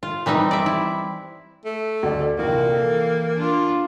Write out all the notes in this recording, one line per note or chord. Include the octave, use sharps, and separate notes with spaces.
F4
E3 G3 C4 D#4
D5 E5
E4
A3
D2 D5
A#1 C3 E3 A#3 F#4
E3 A4 G5
D4 F4